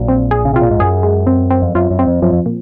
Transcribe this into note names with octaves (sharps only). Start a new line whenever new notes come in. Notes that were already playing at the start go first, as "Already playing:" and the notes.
Already playing: A#1 A#2 F#3
C4
G#4
C#3
C3 F4
A#2
G#2
F#2 G#4
G#3
C4
C4
F2
F#2 F4
F#2
C4
F2
F#2 F3
F2
A#2